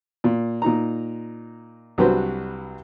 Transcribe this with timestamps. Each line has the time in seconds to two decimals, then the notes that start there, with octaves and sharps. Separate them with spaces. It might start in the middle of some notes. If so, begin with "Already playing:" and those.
0.24 A#2
0.62 A#2 D#4 A#5
1.98 C2 F#3 D4 F#4 B4 C5